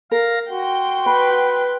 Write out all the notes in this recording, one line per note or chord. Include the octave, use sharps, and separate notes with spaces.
A#4 F5 A#6
F#4 G5 C6
B4 B5